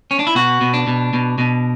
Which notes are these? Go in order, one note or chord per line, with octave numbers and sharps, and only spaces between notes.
C#4
D4
E4
B2 F#4
B2
D4
B2
B2
B2